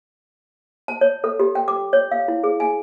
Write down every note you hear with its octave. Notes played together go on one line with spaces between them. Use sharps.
A5
C#5
A4
G4
G5
D6
C#5
F5
E4
G#4
G#5